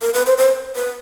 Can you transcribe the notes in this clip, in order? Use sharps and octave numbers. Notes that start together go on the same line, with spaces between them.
A#4
B4
C5
C5
B4